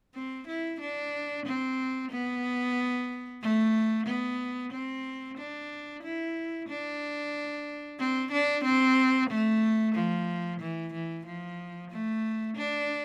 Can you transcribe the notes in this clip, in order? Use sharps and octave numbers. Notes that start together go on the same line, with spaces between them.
C4
E4
D4
C4
B3
A3
B3
C4
D4
E4
D4
C4
D4
C4
A3
F3
E3
E3
F3
A3
D4